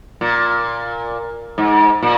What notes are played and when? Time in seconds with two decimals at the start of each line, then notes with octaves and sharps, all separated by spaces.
0.21 A#2
1.58 G#2
2.02 A#2